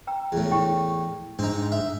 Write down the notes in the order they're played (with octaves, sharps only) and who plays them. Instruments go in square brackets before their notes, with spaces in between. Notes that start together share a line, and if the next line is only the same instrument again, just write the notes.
[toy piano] G5 A#5 E6
[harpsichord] E2 A2
[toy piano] E4 G4 G5
[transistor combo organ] G#2 [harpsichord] C4 D#4 [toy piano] D4
[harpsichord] E5